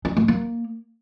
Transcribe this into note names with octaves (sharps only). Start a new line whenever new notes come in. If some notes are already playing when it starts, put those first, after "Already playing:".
D#4
A3
A#3